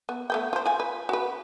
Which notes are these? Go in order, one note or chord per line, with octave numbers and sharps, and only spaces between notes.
B3
A3 B3 G5
F4 C5
F4 G#5
B4
F#4 B4